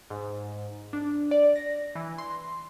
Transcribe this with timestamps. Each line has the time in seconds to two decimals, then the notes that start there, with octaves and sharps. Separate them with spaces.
0.10 G#2
0.93 D4
1.31 D5
1.56 A#6
1.95 E3
2.18 C6